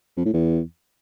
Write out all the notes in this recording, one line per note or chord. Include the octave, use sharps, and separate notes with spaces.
F2
A2
E2